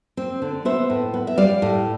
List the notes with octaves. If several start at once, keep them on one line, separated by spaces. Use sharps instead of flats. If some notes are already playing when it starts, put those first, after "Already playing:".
C4
D3
B3 C5 E5
A2
B3
E5
G3 D5 F5
A2